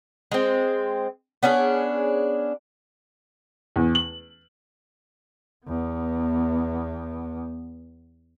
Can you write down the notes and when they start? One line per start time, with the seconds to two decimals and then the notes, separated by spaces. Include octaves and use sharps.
0.32 G#3 C4
1.43 B3 C#4 D4 G#4
3.76 E2
3.95 F#7
5.65 E2 B3